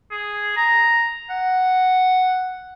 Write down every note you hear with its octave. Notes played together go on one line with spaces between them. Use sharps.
G#4
A#5
F#5